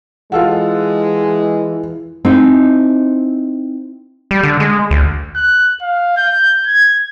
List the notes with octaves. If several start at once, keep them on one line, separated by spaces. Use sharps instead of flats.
E3 G#3 F4 A4 F#5
C4 D#4 E4
G3
D3
G#3
D2
F#6
F5
G6
G#6